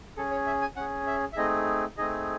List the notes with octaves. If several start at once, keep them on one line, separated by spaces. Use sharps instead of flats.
C#4 G#4 A4
C#5
E5
G#5
C#4 G#4 F#5
E5
E5
A3 C4 D#4 G#4 D#5
A3 C4 D#4 G#4 D#5